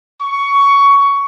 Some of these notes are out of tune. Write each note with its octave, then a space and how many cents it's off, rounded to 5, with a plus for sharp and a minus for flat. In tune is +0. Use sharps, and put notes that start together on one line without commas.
C#6 +15